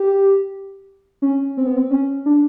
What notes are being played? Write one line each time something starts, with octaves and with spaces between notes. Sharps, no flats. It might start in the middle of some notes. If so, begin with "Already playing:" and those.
Already playing: G4
C#4
C4
B3
C4
C#4
D4